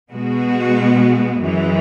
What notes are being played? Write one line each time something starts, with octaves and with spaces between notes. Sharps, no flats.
B2 G#3 B3 F#4
F#2 E3 G#3